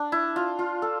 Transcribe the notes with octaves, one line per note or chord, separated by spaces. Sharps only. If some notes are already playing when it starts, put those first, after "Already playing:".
Already playing: D4
E4
F4
F4
A4